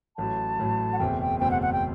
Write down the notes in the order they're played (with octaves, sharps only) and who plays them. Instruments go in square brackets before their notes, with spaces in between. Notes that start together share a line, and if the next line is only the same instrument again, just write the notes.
[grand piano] A1 A2 F#3 [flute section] A5
[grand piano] A1 A2 F#3
[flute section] F#5
[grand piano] F#1 E2 B2 A3 C4 [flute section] G5
[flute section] G5
[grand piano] F#1 E2 B2 A3 C4 [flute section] G5
[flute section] F#5
F#5
G5